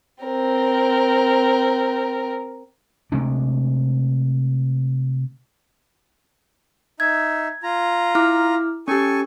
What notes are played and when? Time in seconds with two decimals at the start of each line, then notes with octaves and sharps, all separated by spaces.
0.23 C4 A#4
3.12 C3 G#3 A3 D4
7.00 D#4 E5 G#6
7.63 F4 A#5
8.15 E4 D6 F6
8.88 C#4 G4 A4 G#5 C#6